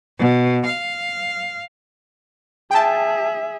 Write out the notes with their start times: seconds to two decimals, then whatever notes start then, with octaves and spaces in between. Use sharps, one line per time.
0.18 B2
0.63 F5
2.71 G#4 E5 G5 A5